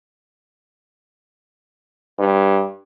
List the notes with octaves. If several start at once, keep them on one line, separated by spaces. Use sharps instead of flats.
G2